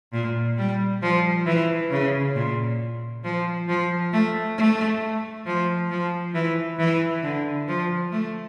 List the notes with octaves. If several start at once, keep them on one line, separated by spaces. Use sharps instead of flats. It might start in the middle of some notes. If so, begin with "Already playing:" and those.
A#2
G3
F3
E3
C#3
A#2
F3
F3
A3
A3
F3
F3
E3
E3
D3
F3
A3